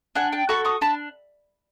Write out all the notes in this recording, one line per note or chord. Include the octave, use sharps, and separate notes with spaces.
D4 F#5 G#5
G5 A5
F#4 A4 B5 C#6
C#6 D#6
D4 A5 B5